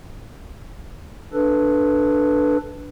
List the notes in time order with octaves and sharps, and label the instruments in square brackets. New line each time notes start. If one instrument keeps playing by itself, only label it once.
[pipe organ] D4 A4 B4